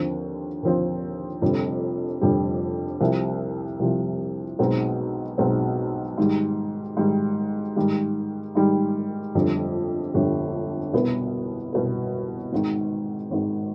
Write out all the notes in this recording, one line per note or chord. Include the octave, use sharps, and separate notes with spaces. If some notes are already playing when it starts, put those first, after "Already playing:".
Already playing: D#2 D3 F3 C4
D#2 D3 F3 C4
F1 F2 D3 G3
F1 F2 D3 G3
C2 C3 F3
C2 C3 F3
B1 B2 G#3 C4 D#4
B1 B2 G#3 C4 D#4
G#2 D#3 G3
G#2 D#3 G3
G#2 D#3 G3
G#2 D#3 G3
G1 F2 D3 G3
G1 F2 D3 G3
C2 B2 B3
C2 B2 B3
G#1 G#2 D#3
G#1 G#2 D#3